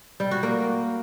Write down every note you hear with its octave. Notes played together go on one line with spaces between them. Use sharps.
G3
F#4
A#3